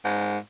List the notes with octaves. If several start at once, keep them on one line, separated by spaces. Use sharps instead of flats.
G#2